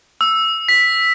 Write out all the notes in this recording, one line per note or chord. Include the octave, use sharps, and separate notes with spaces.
E6
B6